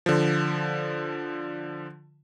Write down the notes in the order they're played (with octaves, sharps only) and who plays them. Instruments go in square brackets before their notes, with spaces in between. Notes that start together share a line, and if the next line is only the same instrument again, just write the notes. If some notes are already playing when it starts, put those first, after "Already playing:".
[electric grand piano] D3 F3